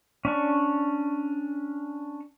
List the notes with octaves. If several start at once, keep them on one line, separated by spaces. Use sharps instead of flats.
C#4 D4 C#6